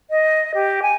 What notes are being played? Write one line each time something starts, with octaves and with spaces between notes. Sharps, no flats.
D#5
G4
G#5